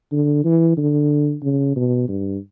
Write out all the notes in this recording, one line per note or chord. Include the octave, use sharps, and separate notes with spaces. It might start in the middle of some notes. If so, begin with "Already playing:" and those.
D3
E3
D3
C#3
B2
G2